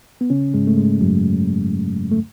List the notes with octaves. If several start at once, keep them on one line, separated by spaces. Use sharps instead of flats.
B3
C#3 C#4
G#2 G#3
A3
G#2 G#3
F#2 F#3
A3